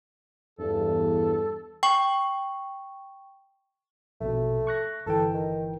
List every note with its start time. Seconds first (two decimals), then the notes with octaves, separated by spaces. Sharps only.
0.59 E2 G2 A4
1.83 G5 C#6
4.21 A#1 B2 A3
4.67 C#6 F#6 A#6
5.06 G1 E3 A4 G5
5.34 D#3